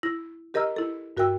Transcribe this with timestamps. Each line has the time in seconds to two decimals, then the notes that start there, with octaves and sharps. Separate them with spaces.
0.03 E4 A#6
0.54 G4 A#4 D#5 A#5 E6 F6
0.76 E4 A4
1.17 G2 F#4 A#4 E5 G5 E6